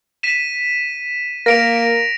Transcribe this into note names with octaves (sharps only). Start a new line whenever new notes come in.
B6 D#7 E7
A#3 A#6 D7 F7
D7